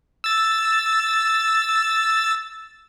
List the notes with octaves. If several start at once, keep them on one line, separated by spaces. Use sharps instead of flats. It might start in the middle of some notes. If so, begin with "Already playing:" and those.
E6 A6